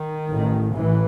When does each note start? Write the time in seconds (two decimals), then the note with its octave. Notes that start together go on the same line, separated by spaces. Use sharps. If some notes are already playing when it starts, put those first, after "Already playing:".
Already playing: D#3
0.28 A1 A2
0.77 A1 E3